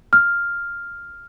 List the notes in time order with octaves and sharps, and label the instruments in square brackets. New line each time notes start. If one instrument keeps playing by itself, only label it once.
[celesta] F6